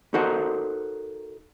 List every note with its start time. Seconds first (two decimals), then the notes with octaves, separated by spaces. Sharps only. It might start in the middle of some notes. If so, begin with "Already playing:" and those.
0.14 D#4 F#4 A4 A#4 C5 F#5